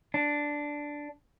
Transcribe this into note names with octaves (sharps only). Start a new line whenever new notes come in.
D4